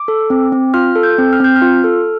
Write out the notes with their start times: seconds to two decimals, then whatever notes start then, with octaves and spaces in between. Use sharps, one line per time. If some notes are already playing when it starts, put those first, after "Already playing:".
Already playing: D6
0.08 A4
0.30 C4
0.52 C4
0.74 F4 F6
0.96 A4
1.03 G6
1.18 C4
1.33 F6
1.40 C4 G6
1.56 F6
1.62 F4
1.84 A4